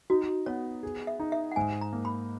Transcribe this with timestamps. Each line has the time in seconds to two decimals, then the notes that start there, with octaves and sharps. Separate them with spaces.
0.10 D#4 F#4
0.46 B3 C#5
0.83 G#4
1.07 E5
1.20 D#4
1.32 E5
1.51 F#5
1.56 G#2 G#5
1.81 A#5
1.93 A#3
2.05 B5